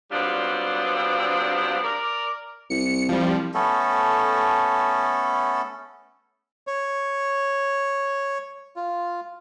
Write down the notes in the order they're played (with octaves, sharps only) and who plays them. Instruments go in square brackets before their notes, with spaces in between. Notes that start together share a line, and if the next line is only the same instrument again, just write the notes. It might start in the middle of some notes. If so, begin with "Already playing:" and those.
[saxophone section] F#3 G3 B3 C4 D4 F4
A#4 D5
[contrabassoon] C2 [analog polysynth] C#7
[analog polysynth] F3 G3
[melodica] A3 B3 C#4 A4
[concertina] C#5
F4